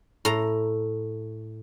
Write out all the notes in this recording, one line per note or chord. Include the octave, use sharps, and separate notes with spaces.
A2 A#5